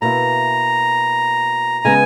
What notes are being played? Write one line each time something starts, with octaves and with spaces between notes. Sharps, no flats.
B2 A#3 E4 A#5
C#3 G#3 B3 G#5